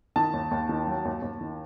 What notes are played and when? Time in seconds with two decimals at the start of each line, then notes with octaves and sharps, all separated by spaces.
0.16 D#3 A5
0.33 D#2
0.51 D#2
0.69 D#3
0.87 F#3
1.05 D#2
1.22 D#2
1.41 D#3